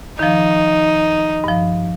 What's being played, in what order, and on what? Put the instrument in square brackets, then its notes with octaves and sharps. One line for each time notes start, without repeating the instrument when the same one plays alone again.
[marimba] D#3 F3 [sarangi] D#4
[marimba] G2 F3